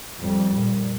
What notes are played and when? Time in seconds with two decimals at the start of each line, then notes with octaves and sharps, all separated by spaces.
0.20 F2 G3
0.56 A#2